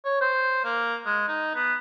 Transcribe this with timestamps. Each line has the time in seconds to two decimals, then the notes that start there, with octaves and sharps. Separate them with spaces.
0.05 C#5
0.21 C5
0.65 A#3
1.06 G#3
1.28 D#4
1.54 B3